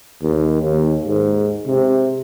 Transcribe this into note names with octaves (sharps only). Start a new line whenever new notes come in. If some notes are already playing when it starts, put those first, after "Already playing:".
D#2
D#2
G#2
C3